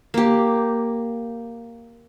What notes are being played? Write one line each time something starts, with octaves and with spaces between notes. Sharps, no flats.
A#3 G4